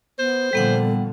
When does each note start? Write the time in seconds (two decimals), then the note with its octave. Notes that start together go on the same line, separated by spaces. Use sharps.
0.19 B3 C5
0.53 A#2 D3 F3 G3 B3 A4 F#5